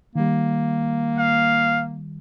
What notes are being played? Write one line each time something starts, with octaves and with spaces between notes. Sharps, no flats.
D#3 G3 A#3
F5